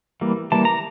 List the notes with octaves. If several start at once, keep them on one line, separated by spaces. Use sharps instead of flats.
E3 G3 A#3
E3 G3 A#3 A5
A#5